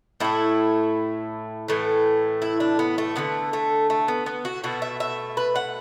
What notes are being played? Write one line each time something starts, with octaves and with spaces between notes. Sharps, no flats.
A2 A3 E4
A2 E3 A3
E4
D4
B3
A3
D3 A3 B3
A3
A3
B3
B3
F#4
B2 A3 F#4
E5
E5
B4
F#5